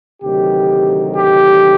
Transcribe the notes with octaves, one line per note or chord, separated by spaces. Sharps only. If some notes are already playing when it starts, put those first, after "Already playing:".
D2 C3 D#3 F#3 G4
G4